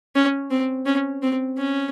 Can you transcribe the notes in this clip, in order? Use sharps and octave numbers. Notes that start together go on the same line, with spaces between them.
C#4
C4
C#4
C4
C#4